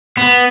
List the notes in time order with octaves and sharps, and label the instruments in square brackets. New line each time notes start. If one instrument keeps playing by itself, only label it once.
[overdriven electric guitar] B3